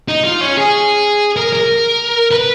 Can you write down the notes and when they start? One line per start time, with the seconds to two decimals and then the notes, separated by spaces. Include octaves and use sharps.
0.08 D#4
0.24 F4
0.41 C#4
0.57 G#4
1.37 A#4
1.53 A#4
2.31 B4